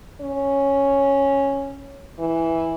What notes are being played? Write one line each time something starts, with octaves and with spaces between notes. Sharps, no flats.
C#4
E3